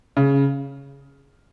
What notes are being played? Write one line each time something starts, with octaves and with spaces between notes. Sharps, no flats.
C#3